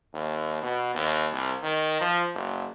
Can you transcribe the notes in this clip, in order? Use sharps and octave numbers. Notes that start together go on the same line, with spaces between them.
D#2
B2
D#2
C2
D#3
F3
F#1